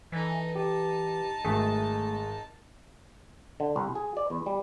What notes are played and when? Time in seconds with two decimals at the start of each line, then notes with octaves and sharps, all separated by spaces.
0.12 E3 D#4 A4
0.56 D#4 G4 A5
1.45 G#1 A3 G#4
3.60 D3
3.76 C2
3.95 G#4
4.17 D5
4.30 E2
4.46 G3